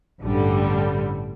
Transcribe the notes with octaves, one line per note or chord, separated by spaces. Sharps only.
A1 G2 D3 G3